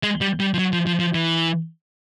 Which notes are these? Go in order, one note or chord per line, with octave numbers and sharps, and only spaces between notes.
G#3
G3
G3
F3
F#3
F3
F3
F3
E3